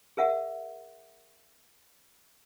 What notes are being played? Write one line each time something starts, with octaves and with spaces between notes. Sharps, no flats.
G#4 A#4 E5 F#5